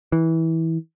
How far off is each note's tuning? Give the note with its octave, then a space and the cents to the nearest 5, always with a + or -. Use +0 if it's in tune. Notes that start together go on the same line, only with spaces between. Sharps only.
E3 -20